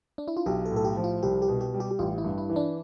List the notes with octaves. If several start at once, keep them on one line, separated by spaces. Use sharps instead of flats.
D4
E4
F4
B1 G4
A4
A2
A4
G4
F3
F4
C2 G4
G4
B2
G4
G3
G4
G4
A1 F4
E4
G2
E4
E3
D4